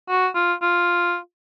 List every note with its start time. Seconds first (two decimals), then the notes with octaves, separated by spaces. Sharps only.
0.09 F#4
0.35 F4
0.62 F4